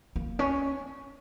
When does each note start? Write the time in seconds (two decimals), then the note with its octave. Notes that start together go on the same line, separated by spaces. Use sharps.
0.16 A#3
0.39 C#4